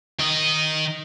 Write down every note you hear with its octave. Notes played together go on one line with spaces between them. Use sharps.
D#3 D#5